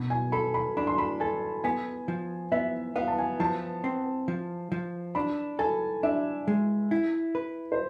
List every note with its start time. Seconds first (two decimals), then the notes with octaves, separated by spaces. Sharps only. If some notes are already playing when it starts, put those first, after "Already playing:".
Already playing: B2
0.10 G#5
0.32 A4 B5
0.54 B5
0.77 D4 B5
0.87 C6
0.98 B5
1.20 A4 G#5
1.64 B3 G#5
2.08 F3
2.52 B3 E5
2.96 B3 F5
3.08 A5
3.19 G#5
3.40 F3 A5
3.84 C4
4.28 F3
4.72 F3
5.15 D4 B5
5.59 A4 G#5
6.03 D4 E5
6.48 G#3
6.91 E4
7.35 B4
7.72 C5